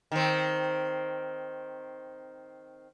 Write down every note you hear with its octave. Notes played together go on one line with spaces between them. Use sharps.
D#3 C4